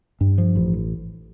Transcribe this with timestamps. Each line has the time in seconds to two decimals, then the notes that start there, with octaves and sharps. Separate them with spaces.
0.21 G2
0.38 F3
0.56 A1